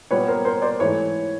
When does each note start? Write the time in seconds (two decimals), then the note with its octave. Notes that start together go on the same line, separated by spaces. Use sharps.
0.11 A#2 G3 B3 B4 C#5
0.28 A#4 C5
0.45 A#4 C5
0.62 C5 D5
0.80 G#2 E3 A3 B4 C#5